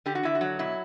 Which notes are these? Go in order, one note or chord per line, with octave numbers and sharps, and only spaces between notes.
D3 G4
F#4
D3 E4
F#4
F#3
B2 E4